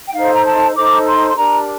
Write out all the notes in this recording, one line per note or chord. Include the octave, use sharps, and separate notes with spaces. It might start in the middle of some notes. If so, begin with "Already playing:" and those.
G5
D#4 A4 C5 F5
A#5
A5
D#4 A4 C5 D6
C6
C6
D4 G4 A#4 A#5